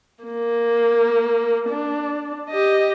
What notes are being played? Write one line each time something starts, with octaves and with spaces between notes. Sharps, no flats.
A#3
D4
G4 D#5